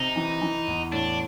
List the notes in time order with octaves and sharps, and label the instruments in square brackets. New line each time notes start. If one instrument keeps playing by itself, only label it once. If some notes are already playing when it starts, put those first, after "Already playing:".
Already playing: [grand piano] C3 [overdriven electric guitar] D#4
[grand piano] E3
E3
E2
[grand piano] A2 [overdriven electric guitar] D4